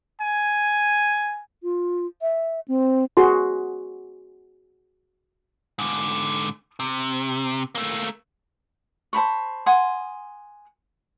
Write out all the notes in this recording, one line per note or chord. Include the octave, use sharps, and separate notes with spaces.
G#5
F4
E5
C4
F#4 G#4 C6
G#2 D3
C3
A3 A#3
C5 A5 B5 C#6
F#5 G#5 C6 D#6